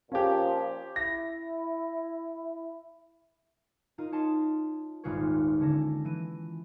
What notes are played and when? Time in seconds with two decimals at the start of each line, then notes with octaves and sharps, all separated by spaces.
0.12 A#2 F3 C#4 G4
0.96 E4 A#6
3.98 D#4 F4 A#4 D#5
4.12 C#5 D#5 A5 C6
5.04 D#1 G#1 G#3 F4 B4 C#5
5.60 D3 C#4 A5 A#6
6.05 E3 D#7